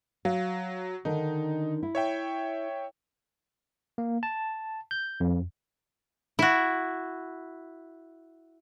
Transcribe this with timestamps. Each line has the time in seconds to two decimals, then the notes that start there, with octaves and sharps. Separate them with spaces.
0.25 F#3 F5
1.05 D3 D#3 D#4
1.83 E4
1.95 C#5 E5 G5
3.98 A#3
4.23 A5
4.91 G6
5.20 F2
6.39 E4 F#4